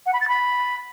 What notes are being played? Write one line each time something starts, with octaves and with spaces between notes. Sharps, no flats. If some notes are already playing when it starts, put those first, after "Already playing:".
F#5
B5
A6
B5